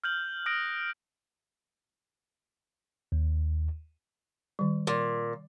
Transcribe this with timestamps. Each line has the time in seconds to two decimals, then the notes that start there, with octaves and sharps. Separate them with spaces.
0.04 F6 G6 F#7
0.46 D#6 F6 F#6 A#6 D7
3.12 D#2
4.59 D#3 G3
4.87 A#2